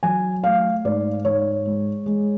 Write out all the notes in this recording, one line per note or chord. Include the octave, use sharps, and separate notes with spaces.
F#3 G#5
A3 F5
G#2 D5
G#2 C#5
G#3
G#3